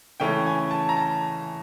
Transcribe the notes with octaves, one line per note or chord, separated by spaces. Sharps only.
C#3 E3 A3 C#4 G5
G#5
A5
A#5
A5